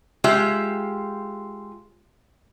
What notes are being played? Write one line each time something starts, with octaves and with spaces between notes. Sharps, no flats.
G#3 F4 G4 E5